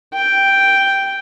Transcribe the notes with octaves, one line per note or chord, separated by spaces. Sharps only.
G5